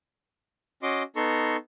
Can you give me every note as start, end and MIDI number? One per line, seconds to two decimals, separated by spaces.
0.83 1.03 61
0.83 1.03 66
0.83 1.03 75
0.83 1.03 84
0.83 1.03 86
1.16 1.56 59
1.16 1.56 63
1.16 1.56 69
1.16 1.56 82
1.16 1.56 84
1.16 1.56 85